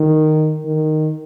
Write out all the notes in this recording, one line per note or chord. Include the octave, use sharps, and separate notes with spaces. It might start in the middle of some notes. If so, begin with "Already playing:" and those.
Already playing: D#3
D#3